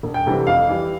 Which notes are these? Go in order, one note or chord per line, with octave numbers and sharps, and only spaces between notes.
E1
G5
D2 C3 E3 G3
F2 F5
E3 G3